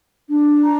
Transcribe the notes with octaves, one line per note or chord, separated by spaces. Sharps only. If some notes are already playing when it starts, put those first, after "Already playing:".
D4
A#5